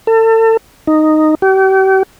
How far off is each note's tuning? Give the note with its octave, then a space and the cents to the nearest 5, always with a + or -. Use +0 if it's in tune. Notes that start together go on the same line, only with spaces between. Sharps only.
A4 +35
D#4 -5
G4 -40